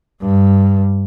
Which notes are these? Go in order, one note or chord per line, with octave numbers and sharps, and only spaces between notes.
G2